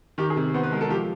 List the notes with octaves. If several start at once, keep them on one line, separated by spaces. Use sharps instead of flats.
D#3 G4
G#4
C3
B3 C5
B4
G#3 A#4
A4
F3 G4